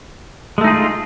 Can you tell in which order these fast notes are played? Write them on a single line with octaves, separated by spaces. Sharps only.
G#3 A3 D#4 G#4 F4